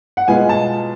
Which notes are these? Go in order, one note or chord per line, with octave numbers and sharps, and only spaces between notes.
F#5
B2 G#3 B3 F4 G#5
A5